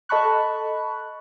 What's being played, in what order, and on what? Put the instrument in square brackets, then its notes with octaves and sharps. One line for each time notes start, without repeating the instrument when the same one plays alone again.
[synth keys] A4 D#5 A5 B5 C#6 F#6